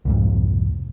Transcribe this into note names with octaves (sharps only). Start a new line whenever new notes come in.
C2 F2 G#2